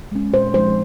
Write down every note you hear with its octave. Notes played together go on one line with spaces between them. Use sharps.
G#3 C#4
A#2 C5
F3 G#3 D#4 C5